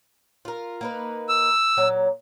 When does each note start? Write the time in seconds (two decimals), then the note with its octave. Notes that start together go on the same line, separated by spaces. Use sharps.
0.45 F4 A#4
0.81 A#3 D#4 B4
1.29 E6
1.77 A#2 F#3